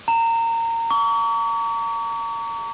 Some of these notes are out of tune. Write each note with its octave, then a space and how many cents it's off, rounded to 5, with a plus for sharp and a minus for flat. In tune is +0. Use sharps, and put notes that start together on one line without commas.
A#5 -25
C#6 +40